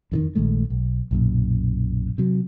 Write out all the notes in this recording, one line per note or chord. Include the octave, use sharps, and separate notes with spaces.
F2 D3 D#3
A#1 D#3 G#3 A3
B1
B1 F#2 A#2
C3 F#3